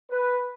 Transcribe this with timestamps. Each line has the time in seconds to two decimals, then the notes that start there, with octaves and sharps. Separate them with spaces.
0.10 B4